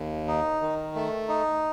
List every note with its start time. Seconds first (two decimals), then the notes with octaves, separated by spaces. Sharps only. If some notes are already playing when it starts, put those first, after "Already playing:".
Already playing: D#2
0.28 D#4
0.61 D#3
0.95 A3
1.28 D#4